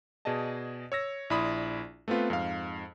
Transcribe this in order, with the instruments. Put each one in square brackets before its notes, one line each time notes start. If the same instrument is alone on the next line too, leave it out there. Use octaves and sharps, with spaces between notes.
[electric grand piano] B2 G#4 D5 D#5 A5
C#5 E6 A#6
A#1 E4 D5 B5 C6 D#6
A3 B3 C4 F4 B4
F2 G#2 F5